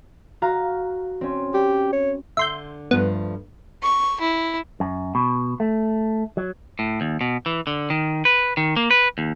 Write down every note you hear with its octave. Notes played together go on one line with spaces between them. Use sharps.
F#4 F5 A#5
C4 C#4
G4
C#5
D3 E5 C6 G6
G2 F3 A3 B3
C#6
E4
F#2
B2
A3
F#3
A2
D#2
B2
E3
D3
D#3
B4
D#3
A#3
B4
D#2